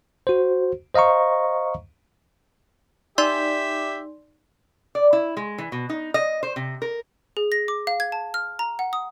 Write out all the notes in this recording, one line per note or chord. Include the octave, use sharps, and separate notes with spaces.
F#4 C5
C5 D#5 F5 A#5 C#6
D#4 G4 D5 E5 C6
D5
E4
G#3
E3
B2
D#4
D#5
C5
C3
A#4
G#4
A#6
D6
F5
G#6
A5
F6
A#5
F#5
D#6